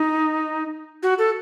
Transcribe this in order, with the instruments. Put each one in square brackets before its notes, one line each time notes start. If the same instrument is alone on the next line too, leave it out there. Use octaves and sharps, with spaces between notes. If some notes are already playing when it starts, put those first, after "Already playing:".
Already playing: [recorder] D#4
F#4
A4